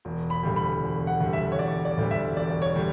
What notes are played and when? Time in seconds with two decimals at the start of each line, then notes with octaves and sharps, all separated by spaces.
0.05 E1
0.30 B5
0.43 D2 D3 G3
0.56 B5
0.82 E1
1.07 F#5
1.20 D2 D3 G3
1.33 E5
1.52 C#5
1.59 E1 D5
1.85 D5
1.98 D2 D3 G3
2.11 E5
2.36 E1 D5
2.62 C#5
2.75 D3 G3